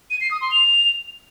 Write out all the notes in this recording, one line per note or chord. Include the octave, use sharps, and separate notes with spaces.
D#7
C7
D#6
C6
F7